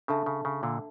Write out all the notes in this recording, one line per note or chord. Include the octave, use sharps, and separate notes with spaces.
C#3 D4 A4 E5 A5
C#3
C#3
A#2 D3